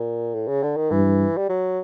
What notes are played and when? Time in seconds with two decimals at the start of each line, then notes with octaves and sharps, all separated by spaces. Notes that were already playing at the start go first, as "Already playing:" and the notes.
Already playing: A#2
0.34 A2
0.48 C#3
0.63 D3
0.77 D#3
0.91 G2 E3
1.37 G3
1.49 F#3